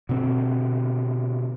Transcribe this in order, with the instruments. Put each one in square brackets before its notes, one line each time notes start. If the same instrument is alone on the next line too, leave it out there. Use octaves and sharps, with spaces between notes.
[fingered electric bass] B2 D3 C4